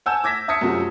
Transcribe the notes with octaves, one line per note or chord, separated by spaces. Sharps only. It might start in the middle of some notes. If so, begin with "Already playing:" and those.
F#5 G#5 A5 E6 G6 E7
D6 G#6 A#6 B6
E5 A5 D#6 G#6 B6 C#7
F#2 C3 F3 A3 C#4 F#4